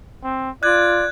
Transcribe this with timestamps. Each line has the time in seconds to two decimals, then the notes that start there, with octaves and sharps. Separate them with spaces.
0.24 C4
0.63 F4 D5 F#6 G#6